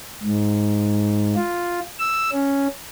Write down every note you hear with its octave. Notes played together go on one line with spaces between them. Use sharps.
G#2
F4
E6
C#4